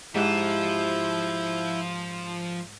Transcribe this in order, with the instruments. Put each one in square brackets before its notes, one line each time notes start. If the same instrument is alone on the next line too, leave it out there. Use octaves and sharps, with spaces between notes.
[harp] G#2 G4 F#6 [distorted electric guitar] F3 A5 [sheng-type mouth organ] E4 G6